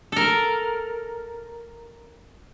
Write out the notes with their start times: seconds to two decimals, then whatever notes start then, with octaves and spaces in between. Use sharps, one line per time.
0.12 A4 A#4